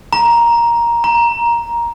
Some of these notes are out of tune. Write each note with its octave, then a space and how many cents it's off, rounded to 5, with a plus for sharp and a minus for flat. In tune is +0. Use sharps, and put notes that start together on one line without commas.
A#5 +10
A#5 +15